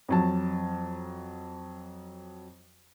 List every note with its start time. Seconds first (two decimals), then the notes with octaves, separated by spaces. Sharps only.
0.09 F2 F#3 A5